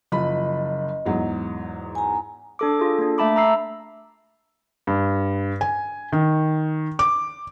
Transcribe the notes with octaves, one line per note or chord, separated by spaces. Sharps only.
F#1 F3 D#5 B5
E2 G#2 F#3
G#5 A#5
D4 A4 D6
F4 G#4 A4
A#3 D4
A3 E5 A5 B5 D6
A#5 B5 E6 C7
G2
G#5
D#3
D6